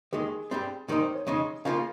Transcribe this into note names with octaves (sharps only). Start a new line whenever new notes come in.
D#2 D#3 G#3 G#4
G2 G3 C4
G#2 D#3 G3 C4 D#4 A#4
C5
C#5
F2 C#3 G#3 D#4 D#5
C#3 F3 A#3 F4 F5